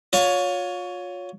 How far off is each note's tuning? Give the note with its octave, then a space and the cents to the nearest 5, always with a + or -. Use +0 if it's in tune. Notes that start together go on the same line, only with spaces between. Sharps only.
F4 +35 C#5 +15